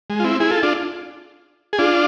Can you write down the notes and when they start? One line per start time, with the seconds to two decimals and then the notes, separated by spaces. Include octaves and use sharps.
0.10 G#3
0.20 F4
0.24 C4 E4
0.40 E4 G#4
0.51 F4 A4
0.63 D4 F4
1.73 G#4
1.79 D4 F4